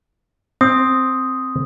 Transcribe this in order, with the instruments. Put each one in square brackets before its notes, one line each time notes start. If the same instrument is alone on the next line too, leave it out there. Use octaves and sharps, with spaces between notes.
[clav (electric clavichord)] C4 [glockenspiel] D#6